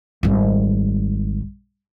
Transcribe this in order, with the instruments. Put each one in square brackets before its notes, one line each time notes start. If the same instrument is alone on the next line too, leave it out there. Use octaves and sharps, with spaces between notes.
[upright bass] G#1 G3